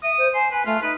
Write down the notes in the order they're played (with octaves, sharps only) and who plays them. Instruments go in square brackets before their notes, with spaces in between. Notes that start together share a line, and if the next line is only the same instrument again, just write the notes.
[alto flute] E5 [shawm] D#6
[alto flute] C5
[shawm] C5 [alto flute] G#5
[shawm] B4 [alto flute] G#5
[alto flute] A3 [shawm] F4
[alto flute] D#4 [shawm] B4